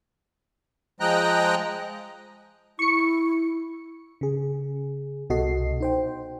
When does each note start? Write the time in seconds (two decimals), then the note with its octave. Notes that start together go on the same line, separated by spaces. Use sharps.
1.00 F3 G#3 D#5 G5 A#5 F#6
2.79 E4 C#6 C#7
4.21 C#3 G#4
5.30 C2 B2 F#4 A4 D#5 C7
5.80 D#4 C5 G5